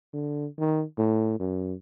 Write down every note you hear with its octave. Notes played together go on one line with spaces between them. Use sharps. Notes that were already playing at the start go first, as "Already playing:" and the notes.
D3
D#3
A2
F#2